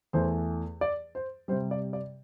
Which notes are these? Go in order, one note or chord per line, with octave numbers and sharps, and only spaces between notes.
E2 E3 A3 C5
D5
C5
C3 G3 C5
D5
D5